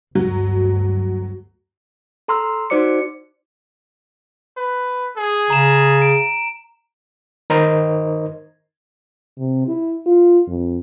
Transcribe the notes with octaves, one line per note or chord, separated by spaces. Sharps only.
G1 D2 G2 F#3
A4 A#5 C6 E6 F6
D#4 F#4 C5 D5 D6 C#7
B4
G#4
C#3 A#5 E7
D7
D#3 D#4 A#4 C5 D#5
C3
E4
F4
F2